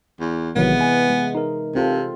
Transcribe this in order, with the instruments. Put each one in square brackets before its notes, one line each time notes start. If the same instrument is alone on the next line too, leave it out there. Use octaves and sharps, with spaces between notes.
[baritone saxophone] E2
[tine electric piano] A1 D#3 F#3 [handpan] C3 E3 G#3 [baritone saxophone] B3
[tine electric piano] G#5
[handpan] G#3
[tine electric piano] D#4 A#4
[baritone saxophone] C3 [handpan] C4 F4 A4